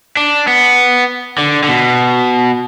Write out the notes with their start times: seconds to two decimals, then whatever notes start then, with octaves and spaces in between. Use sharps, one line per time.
0.17 D4
0.48 B3
1.38 D3
1.63 D3
1.68 B2